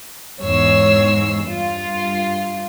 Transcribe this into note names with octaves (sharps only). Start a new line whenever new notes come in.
E2 G#2 C#5 E6 C7
G2 F4